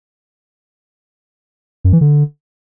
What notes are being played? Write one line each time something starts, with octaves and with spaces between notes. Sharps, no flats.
F#2
E3
D3